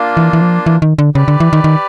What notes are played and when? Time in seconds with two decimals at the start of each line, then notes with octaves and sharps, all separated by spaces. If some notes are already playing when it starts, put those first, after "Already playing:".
Already playing: A#3 D4 F4
0.17 E3
0.33 E3
0.41 F3
0.66 E3
0.82 D#3
0.98 D3
1.15 C#3 G4 B4 D5
1.28 D3
1.40 E3
1.53 D#3
1.64 D#3